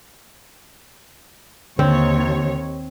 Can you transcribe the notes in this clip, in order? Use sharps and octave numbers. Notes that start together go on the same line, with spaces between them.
D#2 D3 C4 C#5